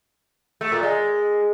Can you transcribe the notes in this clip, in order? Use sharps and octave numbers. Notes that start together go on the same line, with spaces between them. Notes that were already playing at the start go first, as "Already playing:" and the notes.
A3
A#2
G#3